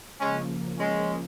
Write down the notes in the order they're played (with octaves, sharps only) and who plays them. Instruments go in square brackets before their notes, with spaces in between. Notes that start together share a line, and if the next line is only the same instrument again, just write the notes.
[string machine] C#3 F3 A#3 [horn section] G#3 C#4
[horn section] G#3 C#4